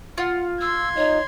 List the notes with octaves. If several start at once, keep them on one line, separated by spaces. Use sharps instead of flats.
F4 F#5
C6 E6 G#6
D#4 C#5